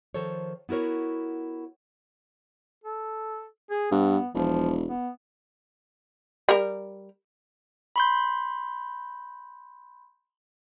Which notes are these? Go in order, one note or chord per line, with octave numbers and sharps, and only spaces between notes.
D#3 F3 A4 C5 C#5
B3 E4 F#4 A#4 C#5
A4
G#4
G2 B3
E1 F3
B3
G3 A#4
B5 C6 G6